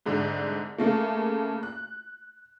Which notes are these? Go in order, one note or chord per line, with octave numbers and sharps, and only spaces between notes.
C2 G#2 D3
C#3 A3 A#3
F#6